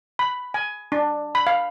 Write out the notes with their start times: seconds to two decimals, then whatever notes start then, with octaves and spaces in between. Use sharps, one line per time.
0.19 B5
0.54 G#5
0.92 D4
1.35 B5
1.47 F5